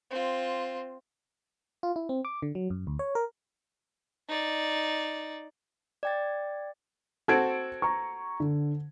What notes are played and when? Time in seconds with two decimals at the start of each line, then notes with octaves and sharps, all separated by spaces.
0.10 C4 F4
1.83 F4
1.96 E4
2.09 C4
2.25 D6
2.42 D3
2.55 F#3
2.70 F#2
2.87 D2
2.99 C#5
3.15 A#4
4.28 D#4 D5
6.03 D5 G5 A6
7.28 C4 F#4 A4 A5 G#6 D7
7.82 A#5 C#6
8.40 D3